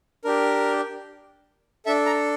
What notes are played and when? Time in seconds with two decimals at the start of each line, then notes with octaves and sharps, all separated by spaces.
0.24 D4 G4 A#4
1.86 D4 A4 E5
2.06 A#5